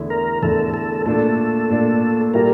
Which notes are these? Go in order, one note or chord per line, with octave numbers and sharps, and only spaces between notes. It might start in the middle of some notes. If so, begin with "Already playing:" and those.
Already playing: E2 D3 A3 E4
A#4
E2 D3 A3 E4 A4
A4
A#2 A3 D4 A4
A#2 A3 D4
A#2 G3 A#3 E4 G4 A#4